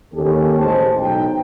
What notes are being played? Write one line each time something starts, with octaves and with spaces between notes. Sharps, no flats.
D#2 C#4 G4 A4
A1 G#3 C5 A5
B1 D#4 G5